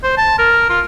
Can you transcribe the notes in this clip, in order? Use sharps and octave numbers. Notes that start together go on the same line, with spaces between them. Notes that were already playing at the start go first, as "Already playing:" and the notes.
C5
A5
A#4
F4